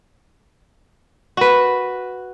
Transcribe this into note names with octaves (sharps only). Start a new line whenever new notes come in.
F#4 B4